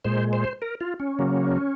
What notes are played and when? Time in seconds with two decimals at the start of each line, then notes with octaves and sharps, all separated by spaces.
0.04 A#2 G#3 C5
0.33 C5
0.62 A#4
0.81 F4
1.00 C#4
1.19 C#3 F#3 A#3